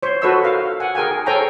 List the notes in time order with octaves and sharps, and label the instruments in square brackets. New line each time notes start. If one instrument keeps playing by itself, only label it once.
[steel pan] C5 C#5
F#4 A4 B4 D#5 C#6 E6
A#4 F5
F#5 G#5
G#4 A#4 G5 G#5
A4 C5 C#5 G5 G#5 A#5